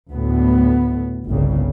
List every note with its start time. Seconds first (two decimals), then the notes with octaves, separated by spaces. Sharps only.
0.11 D2 A2 B3
1.26 G1 C2 G2 C#3